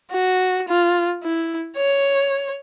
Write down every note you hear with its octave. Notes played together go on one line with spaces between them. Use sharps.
F#4
F4
E4
C#5